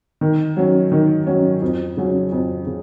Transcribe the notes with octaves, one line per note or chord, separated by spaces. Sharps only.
D#3
F#3 C#4
D#3
F#3 C#4
F2
C#3 F#3 C#4
F2
C#3